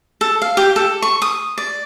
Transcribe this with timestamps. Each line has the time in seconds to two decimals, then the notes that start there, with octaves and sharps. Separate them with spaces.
0.21 A4
0.42 F5
0.57 G4
0.76 A4
1.02 C#6
1.22 D#6
1.58 D5